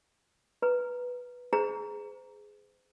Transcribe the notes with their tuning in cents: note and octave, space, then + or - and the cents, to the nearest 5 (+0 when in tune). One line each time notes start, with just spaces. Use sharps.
B4 -5 A#5 +0
G#4 +0 C5 -40 A#5 +0